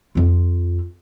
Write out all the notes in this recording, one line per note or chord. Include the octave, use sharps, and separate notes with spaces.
F2 F4